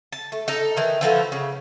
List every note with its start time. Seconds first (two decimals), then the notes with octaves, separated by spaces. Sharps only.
0.12 A5
0.32 A3
0.48 D#4 A4
0.77 D#3 E3
1.01 E3 F3 A3 F#4
1.32 C#3